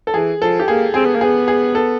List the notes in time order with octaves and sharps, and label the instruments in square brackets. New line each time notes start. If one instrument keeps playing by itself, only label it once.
[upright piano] A4
[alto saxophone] E3 [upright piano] G#4
[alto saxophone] F3 [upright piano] A4
[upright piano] G4
[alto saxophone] A#3 [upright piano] G#4
[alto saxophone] C4 [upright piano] G#4
[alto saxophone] B3
A#3
[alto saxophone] B3 [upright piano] G#4
[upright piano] G#4
A4